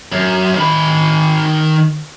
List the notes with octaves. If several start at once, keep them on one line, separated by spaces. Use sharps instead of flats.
F#2
D#3 B5